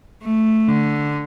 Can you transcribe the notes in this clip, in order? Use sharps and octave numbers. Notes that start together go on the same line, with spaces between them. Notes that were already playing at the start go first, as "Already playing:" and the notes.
A3
D3